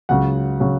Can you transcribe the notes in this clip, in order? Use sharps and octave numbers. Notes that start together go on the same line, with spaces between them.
C#2 C#3 F#3 F#5
C#3 F#3